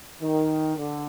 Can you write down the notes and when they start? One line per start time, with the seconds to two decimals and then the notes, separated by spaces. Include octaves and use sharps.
0.21 D#3
0.77 D3